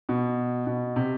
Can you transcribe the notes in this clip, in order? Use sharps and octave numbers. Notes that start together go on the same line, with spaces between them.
B2
B2
C3